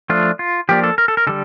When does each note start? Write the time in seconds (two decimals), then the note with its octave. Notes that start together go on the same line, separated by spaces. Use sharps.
0.10 F3 A3 D4 F4
0.39 F4
0.69 F3 A#3 D4 G4
0.84 A4
0.98 A#4
1.08 A4
1.17 A#4
1.27 D3 G3 A4